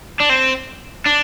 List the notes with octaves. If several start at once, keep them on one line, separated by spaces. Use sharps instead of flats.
D4
C4
D4